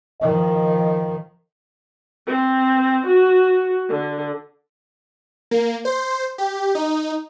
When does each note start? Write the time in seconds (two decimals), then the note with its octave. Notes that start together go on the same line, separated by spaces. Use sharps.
0.21 D#3 F3 D#5
2.27 C4
3.06 F#4
3.89 D3
5.51 A#3
5.85 C5
6.38 G4
6.75 D#4